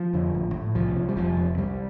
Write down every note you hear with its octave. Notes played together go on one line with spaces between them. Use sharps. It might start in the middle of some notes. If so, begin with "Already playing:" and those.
Already playing: F3
F2 D3
A1
A2
C2 F3
C3
G3
F1 F3
F2 C3
C2 G3